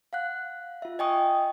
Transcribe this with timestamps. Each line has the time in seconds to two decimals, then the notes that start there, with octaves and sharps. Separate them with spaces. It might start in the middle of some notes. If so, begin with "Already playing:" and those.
0.13 F5 F#5 F#6
0.82 F4 E5
0.99 D#5 E5 G5 G#5 C#6 D#6